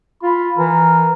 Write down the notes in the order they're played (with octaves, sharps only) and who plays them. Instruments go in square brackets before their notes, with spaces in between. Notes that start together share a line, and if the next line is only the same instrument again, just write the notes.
[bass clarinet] F4 [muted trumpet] B5
[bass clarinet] E3 [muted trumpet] A#4